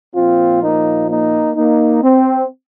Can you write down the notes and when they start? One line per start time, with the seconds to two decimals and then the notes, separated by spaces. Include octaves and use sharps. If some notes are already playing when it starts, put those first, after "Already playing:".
0.16 A#2 F3 C4 F4
0.62 A#3 D#4
1.09 A#3 D#4
1.56 A#3 D#4
2.03 C4